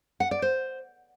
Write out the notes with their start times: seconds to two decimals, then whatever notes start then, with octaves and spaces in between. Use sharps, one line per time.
0.20 F#5
0.31 D5
0.42 C5